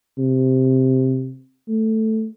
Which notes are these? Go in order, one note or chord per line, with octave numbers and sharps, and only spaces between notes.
C3
A3